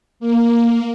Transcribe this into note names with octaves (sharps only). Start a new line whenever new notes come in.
A#3